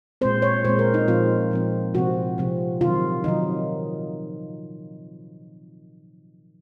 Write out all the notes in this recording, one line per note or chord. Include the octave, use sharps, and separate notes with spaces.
A#2 G#3 C4 C5
C#5
A#2 G#3 C4 C5
A#4
D#4
A#2 F3 C4 F4
A#2 F3 C4
C3 F3 C4 F#4
C3 F3 C4
C3 D#3 F#3 F4
C3 D#3 F#3 D#4